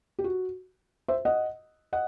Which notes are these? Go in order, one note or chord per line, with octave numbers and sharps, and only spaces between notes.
G4
F#4
C5 E5
D#5 F#5
D#5 F#5